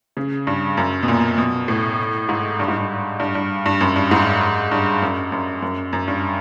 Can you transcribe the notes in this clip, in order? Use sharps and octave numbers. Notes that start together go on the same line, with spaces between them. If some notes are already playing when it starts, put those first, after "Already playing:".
C#3
G2
F#2
B2
A#2
B2
A2
G#2
G2
G#2
G2
G2
G2
G2
F#2
G2
G#2
G2
F#2
F#2
F#2
F#2
G2